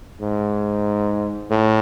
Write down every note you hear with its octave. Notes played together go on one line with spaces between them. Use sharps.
G#2
A2